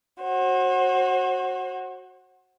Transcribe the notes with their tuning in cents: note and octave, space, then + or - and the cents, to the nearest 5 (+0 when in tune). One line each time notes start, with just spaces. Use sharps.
F#4 +0 C5 +45